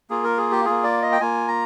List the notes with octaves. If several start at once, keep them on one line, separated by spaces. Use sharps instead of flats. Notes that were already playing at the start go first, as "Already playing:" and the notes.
A#3 F4 G#4
A#4
G#4
G4
A#3 F4 G#4
D5
D#5
G5
A#3 F4 G#5
A#5